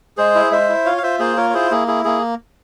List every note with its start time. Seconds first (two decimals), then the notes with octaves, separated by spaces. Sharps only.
0.17 G#3 G#4 C5
0.35 E4
0.51 G#3 C5 E5
0.69 E4
0.85 F4 C#5 F5
0.98 F5
1.03 F4 C5 E5
1.19 A#3 G#4 C5
1.36 F4 A#4 C#5
1.50 C#5
1.54 E4 G#4 C5
1.71 A#3 G#4
1.88 E4 G#4
2.04 A#3 G#4